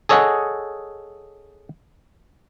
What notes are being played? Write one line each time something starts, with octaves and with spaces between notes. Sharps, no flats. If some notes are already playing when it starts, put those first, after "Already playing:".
G#4 A4 C#5 D#5 F#5 G#5